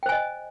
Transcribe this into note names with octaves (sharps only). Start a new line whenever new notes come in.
C5 D#5 G5 G#5